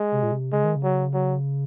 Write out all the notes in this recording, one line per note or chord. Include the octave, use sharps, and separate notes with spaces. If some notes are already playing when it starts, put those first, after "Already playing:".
Already playing: G#3
C3
A#2
C3
C#3 G#3
D#3
C#3
F#3
F#3